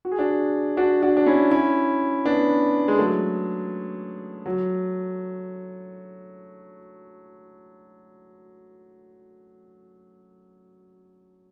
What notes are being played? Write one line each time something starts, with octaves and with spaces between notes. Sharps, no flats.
F#4
G#4
D4 F#4
D4 F#4
D4 F#4
D4
C#4 E4
C#4 E4
B3 D4
G#3
F#3 A3
F#3